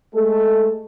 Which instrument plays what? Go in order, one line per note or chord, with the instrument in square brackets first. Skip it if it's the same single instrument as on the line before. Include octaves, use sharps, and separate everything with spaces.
[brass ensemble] G#3 A3 A4